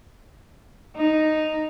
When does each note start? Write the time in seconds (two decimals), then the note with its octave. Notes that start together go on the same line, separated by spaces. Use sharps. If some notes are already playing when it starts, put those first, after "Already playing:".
0.97 D#4